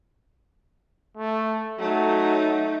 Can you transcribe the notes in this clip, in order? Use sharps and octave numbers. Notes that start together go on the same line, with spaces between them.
A3
F#3 A3 D#4